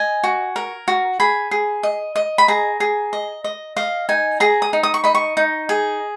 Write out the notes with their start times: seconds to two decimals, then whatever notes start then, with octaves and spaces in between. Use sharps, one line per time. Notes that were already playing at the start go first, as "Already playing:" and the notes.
Already playing: D#5 G#5
0.23 F#4
0.56 A#4
0.88 F#4
1.20 G#4 B5
1.51 G#4
1.83 D#5
2.16 D#5
2.38 B5
2.48 G#4 A#5
2.80 G#4
3.13 D#5
3.44 D#5
3.76 D#5 F5
4.09 D#4 G#5
4.40 G#4 A#5
4.62 D#6
4.73 D#4
4.83 D#6
4.94 C#6
5.04 D#5 B5
5.15 C#6
5.37 D#4
5.69 G#4